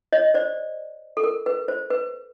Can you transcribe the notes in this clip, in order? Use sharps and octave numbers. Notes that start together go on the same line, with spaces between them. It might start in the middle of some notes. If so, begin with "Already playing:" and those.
C#5 D#5
C5 D5
A4
A#4
B4
C5
B4